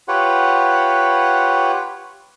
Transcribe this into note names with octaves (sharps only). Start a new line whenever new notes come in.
F4 G4 B4 C#5 F#5